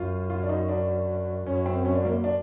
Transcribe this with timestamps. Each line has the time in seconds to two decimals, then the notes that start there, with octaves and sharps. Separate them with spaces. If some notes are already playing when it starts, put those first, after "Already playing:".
Already playing: F#2 F4
0.30 F4
0.43 D4
0.49 D#4
0.69 D4
1.46 F#2 C#4
1.66 C4
1.85 C#4
1.95 D4
2.05 A#3
2.24 D4